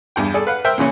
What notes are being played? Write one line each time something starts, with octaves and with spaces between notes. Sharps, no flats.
E2 G2 G5
G#4 A4 D5
B4 F5 F#5
A#4 C5 E5 G5
A#2 C#3 E3 C#4